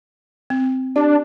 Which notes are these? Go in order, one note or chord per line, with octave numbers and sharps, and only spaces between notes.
C4
D4 G4